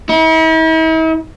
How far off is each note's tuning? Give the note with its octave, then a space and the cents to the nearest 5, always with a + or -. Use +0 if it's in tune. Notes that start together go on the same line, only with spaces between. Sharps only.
E4 -45